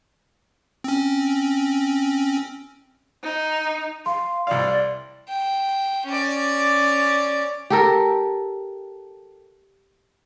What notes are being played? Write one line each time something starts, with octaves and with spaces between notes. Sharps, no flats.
C4 C#4
D#4
F5 C6
C2 D5 F5
G5
C#4 D5
G4 A4 A#4